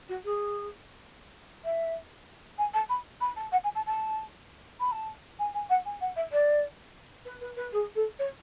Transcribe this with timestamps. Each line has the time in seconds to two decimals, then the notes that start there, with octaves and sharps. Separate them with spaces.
0.09 F#4
0.25 G#4
1.65 E5
2.58 G#5
2.74 A5
2.89 B5
3.21 B5
3.36 A5
3.52 F#5
3.64 G#5
3.75 A5
3.86 A5
4.80 B5
4.92 A5
5.39 G#5
5.54 G#5
5.70 F#5
5.85 G#5
6.01 F#5
6.16 E5
6.32 D5
7.25 B4
7.41 B4
7.57 B4
7.73 G#4
7.95 A4
8.19 C#5